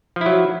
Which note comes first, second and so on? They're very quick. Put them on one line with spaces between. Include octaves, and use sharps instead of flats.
F3 E4 F#3